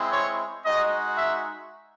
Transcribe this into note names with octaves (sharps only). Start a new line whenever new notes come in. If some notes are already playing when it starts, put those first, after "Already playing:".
Already playing: G#3 C4 E4
C#5
G#3 D#4 F#4 D#5
E5